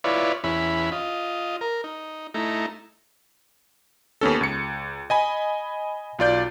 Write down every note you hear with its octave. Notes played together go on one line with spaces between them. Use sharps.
E4 F4 B4 C#5 D5
E2 C#4 E4 B5
F4 D#5
A#4
D#4
A3 D#4 E4 A#5
D#2 B3 C#4 A4
C#2 C#7
D#5 G#5 B5
B1 F4 D5 G6